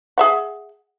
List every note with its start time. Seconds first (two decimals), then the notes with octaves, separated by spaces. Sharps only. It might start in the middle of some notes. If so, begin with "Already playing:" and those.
0.18 G#4 E5 F#5